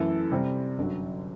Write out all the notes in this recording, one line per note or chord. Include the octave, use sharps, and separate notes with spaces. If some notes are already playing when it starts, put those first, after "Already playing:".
Already playing: F#2 E3 A3 E4 A4
C3 G3 C4
G1 F#2 D3 F#3